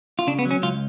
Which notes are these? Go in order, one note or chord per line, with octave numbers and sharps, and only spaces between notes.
F4
C#3 D4
B3
F#3
C#4
C#2 F4